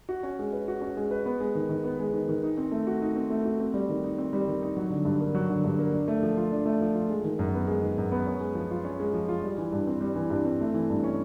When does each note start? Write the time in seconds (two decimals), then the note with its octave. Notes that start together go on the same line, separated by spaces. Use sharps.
0.09 F#4
0.23 C#4
0.39 G#3
0.53 B4
0.68 F#4
0.82 C#4
0.97 G#3
1.11 B4
1.26 B3
1.40 G#3
1.55 D#3
1.69 D#3
1.84 B3
2.00 G#3
2.13 D#3
2.29 D#3
2.43 D#4
2.57 C4
2.71 A3
2.87 F#4
3.02 D#4
3.16 C4
3.30 A3
3.45 F#4
3.60 C4
3.74 G3
3.89 D#3
4.04 D#4
4.18 C4
4.33 G3
4.47 D#3
4.62 D#4
4.77 F#3
4.90 D3
5.05 G2
5.20 A#3
5.35 F#3
5.50 D3
5.64 G2
5.78 A#3
5.93 D4
6.08 A3
6.23 F3
6.37 F4
6.52 D4
6.66 A3
6.81 F3
6.95 F4
7.10 G#3
7.24 D#3
7.39 F#2
7.54 B3
7.67 G#3
7.82 D#3
7.98 F#2
8.12 B3
8.26 C#4
8.40 G#3
8.55 F3
8.71 F4
8.85 C#4
9.00 G#3
9.13 F3
9.29 F4
9.44 G3
9.58 E3
9.72 G2
9.87 C4
10.01 G3
10.16 E3
10.30 G2
10.45 C4
10.60 A3
10.74 E3
10.90 G2
11.04 C#4